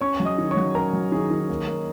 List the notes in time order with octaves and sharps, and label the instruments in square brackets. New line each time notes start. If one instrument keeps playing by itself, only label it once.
[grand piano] C#4 [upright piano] C#5 C#6
[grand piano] F#3
[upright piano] D#5 D#6
[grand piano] D#3
[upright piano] C#5 C#6
[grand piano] F#3
[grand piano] C#4 [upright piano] A#4 A#5
[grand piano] F#3
[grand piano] D#3 [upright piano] G#4
[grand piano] D#3
A#3
A#3